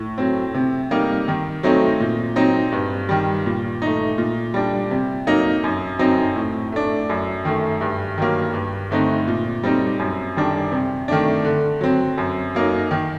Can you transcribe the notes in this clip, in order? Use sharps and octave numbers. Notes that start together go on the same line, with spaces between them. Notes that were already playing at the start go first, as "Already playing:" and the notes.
Already playing: A2
F#3 C4
C3
G3 A#3 D#4
D#3
F#3 A3 C4 D#4
A#2
F#3 C4 D#4
G2
D#3 G3
A#2
A3 D#4
A#2
G3 D4
C3
F#3 A#3 D#4
F#2
F#3 C4 D#4
A2
A3 D4
F#2
D#3 A3
G2
D#3 F#3 A#3
G2
D3 A3 C4 D#4
A#2
G3 C4 D#4
F#2
D#3 G3 D4
C3
D#3 A3 D4
D3
F#3 C4
F#2
F#3 A#3 D#4
D#3